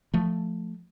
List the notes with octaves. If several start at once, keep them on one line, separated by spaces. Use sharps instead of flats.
F3 A3